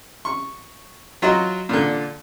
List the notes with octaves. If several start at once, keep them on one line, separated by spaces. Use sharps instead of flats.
C#6
F#3 F4 F#4 D#5 A#5
A#2 D3